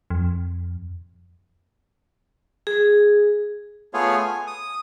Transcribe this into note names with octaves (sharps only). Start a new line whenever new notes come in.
F2
G#4
A3 B3 F4 G#4 C#5
G#5
D#6